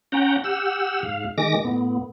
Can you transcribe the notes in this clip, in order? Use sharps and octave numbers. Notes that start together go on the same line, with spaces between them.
C#4 F#5 G5 A#5
G4 F#5 E6
G#2 F5
D#3 G#3 D6 A#6
A2 B3